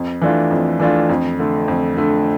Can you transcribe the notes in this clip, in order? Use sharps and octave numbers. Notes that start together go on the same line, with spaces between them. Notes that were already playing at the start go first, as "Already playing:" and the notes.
Already playing: F2
E3 A3 D4 F4
F2
E3 A3 D4 F4
F2
D3 A3
F2
D3 A3